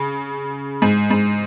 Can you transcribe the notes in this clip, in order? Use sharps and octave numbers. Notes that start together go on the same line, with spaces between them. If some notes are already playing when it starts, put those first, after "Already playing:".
Already playing: C#3
G#2
G#2